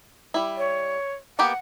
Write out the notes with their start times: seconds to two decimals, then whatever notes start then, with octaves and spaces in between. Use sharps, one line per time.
0.34 G3 E4
0.57 C#5
1.39 A#3 B3 G4 F#5